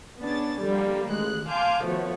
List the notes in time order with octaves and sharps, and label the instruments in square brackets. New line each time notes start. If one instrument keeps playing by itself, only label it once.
[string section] B3 C#4 D4 G#4 A6
D3 F3 G3 A#3
A1 D#3 G#3 F#6
F5 G#5 A5 C6 D6 G6
D#3 F3 A3 B3 F#4 C#5